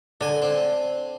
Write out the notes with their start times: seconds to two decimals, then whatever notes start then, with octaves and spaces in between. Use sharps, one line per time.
0.21 D3 D4 G#5
0.42 C4